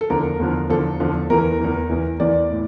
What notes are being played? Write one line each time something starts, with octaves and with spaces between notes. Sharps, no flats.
A4
E2 D3 F3 A#4
E2 D3 F3
E2 D3 F3 A4
E2 D3 F3
E2 E3 A#4
E2 E3
E2 E3
E2 E3 D5
A2